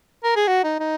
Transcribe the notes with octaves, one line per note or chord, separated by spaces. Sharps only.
A#4
G#4
F#4
D#4
D#4